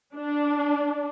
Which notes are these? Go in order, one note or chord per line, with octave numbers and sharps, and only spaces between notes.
D4